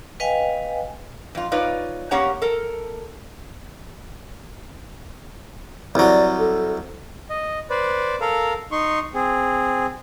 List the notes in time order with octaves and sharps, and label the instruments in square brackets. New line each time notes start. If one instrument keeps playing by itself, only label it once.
[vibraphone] B4 D#5 F5 G5 G#5
[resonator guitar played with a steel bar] F2 F4
D#4 F4 B4 C#5 D5
A#3 C#4 G4 C#5 F#5 A#5
A4 A#4
[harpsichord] C2 F#3 [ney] D5
[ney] A4
[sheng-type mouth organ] D#5
B4 C5 D5
A4 A#4 F5
D#4 C6 C#6
C4 G#4